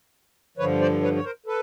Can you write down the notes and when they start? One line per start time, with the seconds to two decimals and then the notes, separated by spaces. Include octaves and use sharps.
0.57 G2 D3 F3 B4 C#5
0.80 C5 D5
1.02 B4 C#5
1.16 C#5
1.24 A#4 C5
1.46 A4 B4